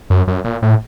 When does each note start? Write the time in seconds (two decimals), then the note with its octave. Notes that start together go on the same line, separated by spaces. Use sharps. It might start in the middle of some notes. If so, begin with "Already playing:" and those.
0.10 F#2
0.28 F#2
0.45 A#2
0.62 A2